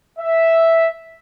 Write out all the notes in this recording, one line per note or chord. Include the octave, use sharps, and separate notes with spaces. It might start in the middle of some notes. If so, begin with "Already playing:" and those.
E5